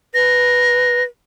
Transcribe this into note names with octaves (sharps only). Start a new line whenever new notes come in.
B4 A#6